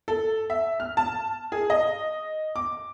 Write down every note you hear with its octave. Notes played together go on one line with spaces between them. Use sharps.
A4
E5
F6
A5
G#4
D#5
D6